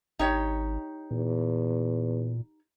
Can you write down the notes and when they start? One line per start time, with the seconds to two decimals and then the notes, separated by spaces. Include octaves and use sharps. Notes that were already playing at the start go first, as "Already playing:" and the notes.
0.19 G#1 D#4 G4 C#5
1.11 E2 A#2